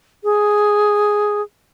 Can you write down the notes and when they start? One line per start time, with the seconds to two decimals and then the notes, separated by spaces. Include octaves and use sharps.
0.24 G#4